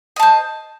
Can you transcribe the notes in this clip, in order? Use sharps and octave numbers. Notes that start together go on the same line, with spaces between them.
C5 D#5 A5